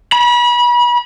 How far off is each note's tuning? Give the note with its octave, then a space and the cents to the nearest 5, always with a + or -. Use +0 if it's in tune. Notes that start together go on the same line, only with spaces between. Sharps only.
B5 -35